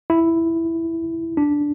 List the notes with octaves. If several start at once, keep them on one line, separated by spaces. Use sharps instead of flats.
E4
D4